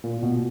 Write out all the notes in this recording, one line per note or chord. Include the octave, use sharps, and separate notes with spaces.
A#2
B2